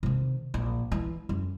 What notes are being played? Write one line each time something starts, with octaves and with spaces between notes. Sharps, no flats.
C3 D#3
A#1
E3
F#2